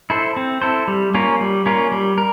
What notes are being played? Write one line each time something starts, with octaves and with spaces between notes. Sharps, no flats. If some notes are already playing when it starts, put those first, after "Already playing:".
E4 A4 C5
C4
E4 A4 C5
G3
A#3 C#4 F4 A#4
G3
A#3 C#4 F4 A#4
G3
A#4